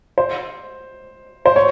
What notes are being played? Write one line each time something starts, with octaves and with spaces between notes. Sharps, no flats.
C5
C5
C#5